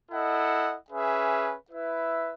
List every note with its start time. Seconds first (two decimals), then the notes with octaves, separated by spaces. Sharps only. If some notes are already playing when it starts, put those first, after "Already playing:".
0.11 E4 A4 D#5 F#5
0.91 C#4 G#4 B4 E5
1.71 E4 B4 E5